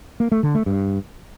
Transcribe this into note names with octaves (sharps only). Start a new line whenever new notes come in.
A#3
A3
D3
A3
G2